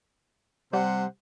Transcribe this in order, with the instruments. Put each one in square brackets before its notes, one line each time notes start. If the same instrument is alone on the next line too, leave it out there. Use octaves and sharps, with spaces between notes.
[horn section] C3 C5 F#5 [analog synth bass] G3